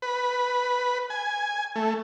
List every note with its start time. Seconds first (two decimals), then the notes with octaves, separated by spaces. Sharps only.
0.02 B4
1.10 G#5
1.76 A3